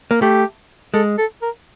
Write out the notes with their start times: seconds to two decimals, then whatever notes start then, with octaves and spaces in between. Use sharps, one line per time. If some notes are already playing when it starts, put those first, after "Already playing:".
0.11 A#3
0.22 A3 G4
0.94 G#3 A4
1.18 A4
1.42 A#4